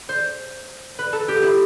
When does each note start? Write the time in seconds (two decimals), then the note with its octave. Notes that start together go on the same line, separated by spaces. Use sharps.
0.09 C5
0.99 B4
1.13 A4
1.28 G4
1.43 E4